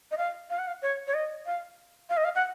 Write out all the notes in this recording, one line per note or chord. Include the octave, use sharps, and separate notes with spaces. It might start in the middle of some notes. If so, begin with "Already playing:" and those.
D#5
F5
F5
F#5
F5
C#5
C#5
D#5
F5
F5
D#5
F5
F#5